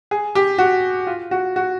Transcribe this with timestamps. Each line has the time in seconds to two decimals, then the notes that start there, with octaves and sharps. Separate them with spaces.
0.11 G#4
0.35 G4
0.58 F#4
1.07 F4
1.31 F#4
1.56 F#4